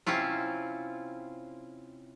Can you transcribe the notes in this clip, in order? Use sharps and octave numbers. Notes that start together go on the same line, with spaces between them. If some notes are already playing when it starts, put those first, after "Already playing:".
C3 C4 C#4 E4 F4